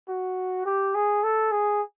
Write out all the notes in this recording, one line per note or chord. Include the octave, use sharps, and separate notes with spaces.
F#4
G4
G#4
A4
G#4